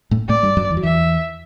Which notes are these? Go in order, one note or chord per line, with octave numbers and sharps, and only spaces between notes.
A2 A3
A2 A3 D5
G2 G3
F#2 F#3
E2 E3
F#3
E2 E3 E5